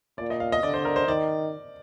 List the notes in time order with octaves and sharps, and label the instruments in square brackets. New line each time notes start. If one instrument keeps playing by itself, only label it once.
[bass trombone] A#2 [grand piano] D5
[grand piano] D#5
F5
D#5
[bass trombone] D3 [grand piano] D5
[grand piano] C5
A#4
C5
[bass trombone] D#3 [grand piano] D5